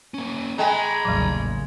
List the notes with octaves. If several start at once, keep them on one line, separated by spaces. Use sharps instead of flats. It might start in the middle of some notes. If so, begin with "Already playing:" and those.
A#3 C#4
G#3 D#5 G5 G#5 A#5 B5
A1 D#2 C#3 F#3 G3